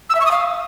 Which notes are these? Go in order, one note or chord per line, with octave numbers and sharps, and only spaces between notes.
E6
E5
C#6
D#6
F5